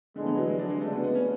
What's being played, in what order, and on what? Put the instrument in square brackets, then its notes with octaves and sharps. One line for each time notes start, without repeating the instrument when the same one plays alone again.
[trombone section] A2 G#3 B3 D4 [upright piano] D3
[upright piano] E3
F#3
G#3
D4
G#3
[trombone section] C#3 G#3 D4 F#4 [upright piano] A3
[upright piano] B3
B3
C#4